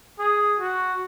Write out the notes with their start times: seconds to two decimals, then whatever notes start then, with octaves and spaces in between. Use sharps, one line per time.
0.19 G#4
0.59 F#4